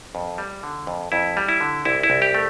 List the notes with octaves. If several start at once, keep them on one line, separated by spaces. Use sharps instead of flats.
F2
G3
D3
F2
F2 E4
G3
E4
D3
C2 E4
E4
C2
G4
A3